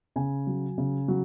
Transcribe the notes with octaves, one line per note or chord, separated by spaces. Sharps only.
C#3 G#5
F#3
C#3
F#3